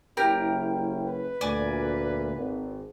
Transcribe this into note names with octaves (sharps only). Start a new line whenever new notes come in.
F#1 C#4 E4 G4 A#4 F6
B4
D2 A#2 D5 G#5
G#1